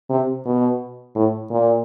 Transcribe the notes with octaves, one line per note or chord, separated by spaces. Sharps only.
C3
B2
A2
A#2